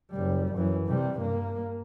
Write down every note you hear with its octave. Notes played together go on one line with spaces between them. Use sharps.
F#1 G3
F#2 E3
C3 G3
G2 A#3